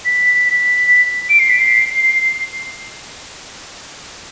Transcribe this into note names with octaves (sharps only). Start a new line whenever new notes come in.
B6
B6
D7
C7
B6
C7